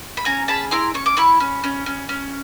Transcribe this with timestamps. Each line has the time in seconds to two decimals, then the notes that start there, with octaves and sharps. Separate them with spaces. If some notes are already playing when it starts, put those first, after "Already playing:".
0.17 B5
0.25 C#4 G#5 A#5
0.48 G#4 A5 B5
0.71 E4 A#5 C6
0.94 C#4 C#6
1.06 D6
1.17 E4 B5 C#6
1.40 C#4
1.64 C#4
1.86 C#4
2.09 C#4